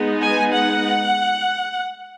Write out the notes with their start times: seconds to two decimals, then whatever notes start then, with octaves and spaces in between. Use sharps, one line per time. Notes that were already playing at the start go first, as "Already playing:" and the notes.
Already playing: G#3 B3 D#4
0.22 G#5
0.53 F#5